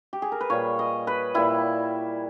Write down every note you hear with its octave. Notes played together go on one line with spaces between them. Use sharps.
G4
G#4
A#4
B4
A#2 G3 C#5
D#5
B4
A#2 G3 E4